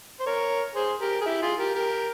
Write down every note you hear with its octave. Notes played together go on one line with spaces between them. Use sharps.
C5
A#4 C#5
G#4 C5
G4 A#4
G#4
E4 G4
F4 G#4
G4 A#4
G4 A#4